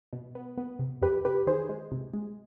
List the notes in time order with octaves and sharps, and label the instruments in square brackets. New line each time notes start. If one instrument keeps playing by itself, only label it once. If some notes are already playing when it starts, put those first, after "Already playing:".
[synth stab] B2
B3
B3
C3
F2 G4 B4
C3 G4 B4
D#3 G#4 C5
G#3
C3
G#3